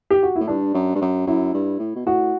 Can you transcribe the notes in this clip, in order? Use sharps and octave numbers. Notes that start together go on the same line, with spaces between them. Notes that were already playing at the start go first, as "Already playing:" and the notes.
G4
F#4
A2 E4
G2 D4
F#2
G2
F#2
F#2 E4
G2
A2
B2
A2 F#4